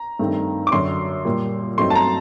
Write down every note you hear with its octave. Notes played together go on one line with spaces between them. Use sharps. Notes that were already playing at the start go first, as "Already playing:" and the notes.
Already playing: A#5
G2 D#3 A3 C4
D6
F#2 D3 F#3 C6
A#2 G3 A#3
G2 F#3 A3 C4 D#4 C6
A5
A#5